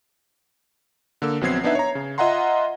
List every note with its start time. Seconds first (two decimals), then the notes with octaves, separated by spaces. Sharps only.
1.22 D3 A#3 E6
1.41 A#1 F#3 B3 C4 G#6 C7
1.63 B3 D4 D#4 B4 E5
1.75 C#5 A#5
1.95 C#3
2.18 F4 D#5 E5 F#5 A#5 C6